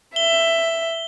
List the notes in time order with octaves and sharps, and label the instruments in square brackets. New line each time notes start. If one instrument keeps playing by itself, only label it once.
[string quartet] E5 [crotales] G7